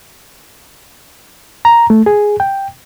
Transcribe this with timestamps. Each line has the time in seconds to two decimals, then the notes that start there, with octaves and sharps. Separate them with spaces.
1.65 A#5
1.90 A3
2.06 G#4
2.40 G5